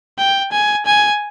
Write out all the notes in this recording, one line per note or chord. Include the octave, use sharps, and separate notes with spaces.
G5
G#5
G#5